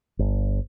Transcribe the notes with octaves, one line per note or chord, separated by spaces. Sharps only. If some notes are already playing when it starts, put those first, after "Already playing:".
G1